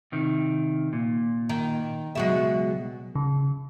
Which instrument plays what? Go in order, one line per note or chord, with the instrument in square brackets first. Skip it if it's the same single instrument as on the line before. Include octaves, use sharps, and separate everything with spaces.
[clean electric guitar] C3 D#3
A#2
[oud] D#3
[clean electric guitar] C#2 B2 F#3 [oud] G#3 F#4 E5
[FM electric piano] C#3